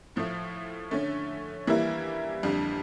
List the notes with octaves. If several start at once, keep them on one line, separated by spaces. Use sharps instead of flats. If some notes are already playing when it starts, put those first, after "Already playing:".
A2 F3 A3
D3 A3 C#4
E3 G3 A#3 E4
F2 D3 G3